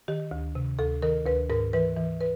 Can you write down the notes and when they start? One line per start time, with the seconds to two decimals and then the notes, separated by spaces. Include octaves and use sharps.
0.08 D#3 G4
0.31 D2
0.55 C3
0.79 D2 A4
1.02 D#3 A#4
1.26 D2 B4
1.50 G#2 A#4
1.73 E3 B4
1.97 E3
2.21 B4